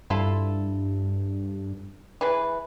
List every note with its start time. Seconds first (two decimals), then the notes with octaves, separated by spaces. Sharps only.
0.10 G2 E4 F4 A4
2.21 E3 G#4 B4